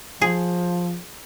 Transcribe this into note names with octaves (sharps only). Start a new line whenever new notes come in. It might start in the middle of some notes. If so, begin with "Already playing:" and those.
F3 G#4